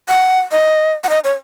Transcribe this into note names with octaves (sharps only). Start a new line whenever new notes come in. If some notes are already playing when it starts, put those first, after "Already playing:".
F#5
D#5
F#5
D#5
C#5